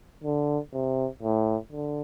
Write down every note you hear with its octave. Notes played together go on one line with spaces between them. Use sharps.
D3
C3
A2
D3